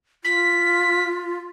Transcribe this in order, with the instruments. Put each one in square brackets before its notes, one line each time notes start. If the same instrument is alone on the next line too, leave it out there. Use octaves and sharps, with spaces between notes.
[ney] F4 [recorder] B6